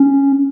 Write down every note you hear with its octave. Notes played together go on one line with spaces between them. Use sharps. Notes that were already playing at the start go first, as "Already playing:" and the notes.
Already playing: C#4